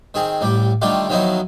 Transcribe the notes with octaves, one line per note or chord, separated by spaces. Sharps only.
D#3 C4 G#4
A1 G3 G4
D3 D#3 G3 A3 F4 G4
D#3 F3 F#3 B3 D#4 E4